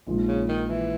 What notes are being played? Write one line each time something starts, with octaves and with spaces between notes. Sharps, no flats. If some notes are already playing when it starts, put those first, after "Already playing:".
A#1 A#2 G#3 D#4
C#3
D#3
E3